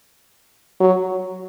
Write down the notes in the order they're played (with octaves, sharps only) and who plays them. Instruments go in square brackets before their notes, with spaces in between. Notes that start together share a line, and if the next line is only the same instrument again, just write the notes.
[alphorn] F#3